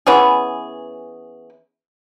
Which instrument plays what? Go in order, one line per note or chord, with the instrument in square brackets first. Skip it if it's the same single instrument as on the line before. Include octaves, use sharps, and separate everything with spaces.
[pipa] E3 B3 C#4 G#4